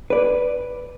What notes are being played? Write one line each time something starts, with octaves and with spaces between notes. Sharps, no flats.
B4 D5